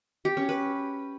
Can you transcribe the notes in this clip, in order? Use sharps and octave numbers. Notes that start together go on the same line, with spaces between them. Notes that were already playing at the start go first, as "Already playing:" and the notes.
G4
C#4
B4